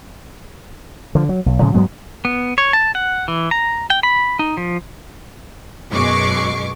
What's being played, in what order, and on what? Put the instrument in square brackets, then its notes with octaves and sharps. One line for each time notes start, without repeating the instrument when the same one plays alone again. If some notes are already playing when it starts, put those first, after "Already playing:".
[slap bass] D3 F3
F#3
B1
A2 C#3 F3 G#3
G2 F#3 G#3 B3
[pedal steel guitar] B3
C#5
A5
F#5
E3
A#5
G5
B5
D#4
F3
[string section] F#2 B2 G#3 C#6 D6 C7